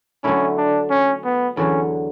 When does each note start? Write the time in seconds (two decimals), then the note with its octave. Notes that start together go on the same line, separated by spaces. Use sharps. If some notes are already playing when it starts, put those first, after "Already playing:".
0.24 D3 F#3 A3 C#4 E4
0.57 D4
0.90 C#4
1.24 B3
1.57 E2 D3 F#3 C#4